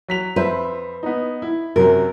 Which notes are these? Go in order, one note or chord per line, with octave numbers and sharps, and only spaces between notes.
F#3 B6 F7
F2 B4 C5 E5
B3 D#4
E4
F#2 C3 F#3 A#4